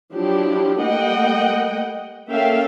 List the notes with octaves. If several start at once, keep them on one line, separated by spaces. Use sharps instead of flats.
F3 F#3 D4 E4 G4
G3 A3 A#3 D#5 F#5 G5
A#3 C#4 A4 E5 F5 G5